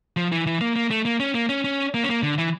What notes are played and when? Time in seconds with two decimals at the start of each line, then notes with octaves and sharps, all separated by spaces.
0.17 F3
0.32 E3
0.47 E3
0.61 A#3
0.76 A#3
0.90 A3
1.05 A#3
1.20 C#4
1.35 A#3
1.49 C#4
1.64 C#4
1.94 A#3
2.03 C#4
2.09 A#3
2.23 D3
2.38 E3